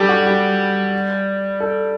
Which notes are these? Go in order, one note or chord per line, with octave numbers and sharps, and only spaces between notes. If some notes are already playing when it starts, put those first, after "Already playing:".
Already playing: G3 G4 A4
F#4
G4
A4